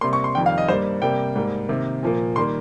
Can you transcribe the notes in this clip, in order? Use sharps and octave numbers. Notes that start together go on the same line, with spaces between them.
C3 G3 A#3 C6
C#6
C6
F2 D#3 G3 G5
F5
D#5
G2 G3 A#3 C5
C3 G3 A#3 G5
G#2 G3 A#3
C3 D#3 A#3
A#2 F3 A#3
D#3 G3 A#3 C6